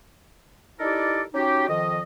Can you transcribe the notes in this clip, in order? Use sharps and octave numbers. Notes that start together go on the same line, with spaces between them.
D#4 E4 G4 A4 A#4 D5
C#4 D#4 F#4 G4
F2 D#3 F3 D#5